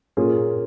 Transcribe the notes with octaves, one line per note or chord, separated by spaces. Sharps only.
A#2 A#3 C#4 F4 G#4